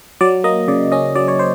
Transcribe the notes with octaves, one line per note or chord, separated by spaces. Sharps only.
F#3 D5
A#3 D#5
C#3 D5
C#4 D#5
F#3 D5
C#5
C5